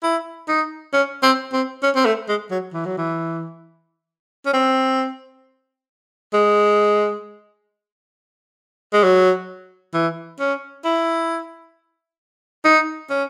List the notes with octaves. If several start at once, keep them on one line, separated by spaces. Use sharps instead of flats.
E4
D#4
C#4
C4
C4
C#4
C4
A3
G#3
F#3
E3
F#3
E3
C#4
C4
G#3
G#3
F#3
E3
C#4
E4
D#4
C#4